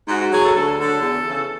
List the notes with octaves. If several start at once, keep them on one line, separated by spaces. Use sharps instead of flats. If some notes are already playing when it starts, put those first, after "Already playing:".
G#2 F#4
F#4
F#3 G#4
A4
D2 A4
D3 F#3 A4
E2
C#3 E3